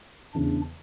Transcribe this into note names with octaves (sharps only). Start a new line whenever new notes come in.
E2 C#3 E3 D4